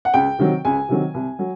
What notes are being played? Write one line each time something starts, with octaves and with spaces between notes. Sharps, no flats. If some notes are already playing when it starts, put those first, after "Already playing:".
F#5
C#2 G5
C3 D#3 F#3
C#2 G#5
C3 D#3 F#3
C2
F#3